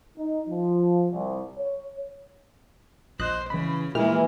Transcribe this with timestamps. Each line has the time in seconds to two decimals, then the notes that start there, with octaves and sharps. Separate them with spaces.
0.18 D#4
0.49 F3
1.12 C2
1.58 C#5
3.20 A#1 C5 D#5 F#6
3.50 C#3 E3 B5
3.95 A#2 E3 F3 G#3 A#3 G4 F6